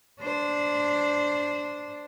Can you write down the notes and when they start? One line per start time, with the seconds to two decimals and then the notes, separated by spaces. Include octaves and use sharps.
0.21 D4 C5